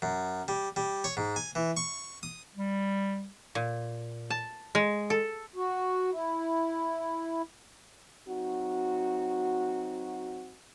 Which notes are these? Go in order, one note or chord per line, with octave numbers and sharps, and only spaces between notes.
F#2
G3
G3
C#5
G#2
G#5
E3
C#6
D#6
G3
A#2
A5
G#3
A4
F#4
E4
F#3 C4 D#4 F#4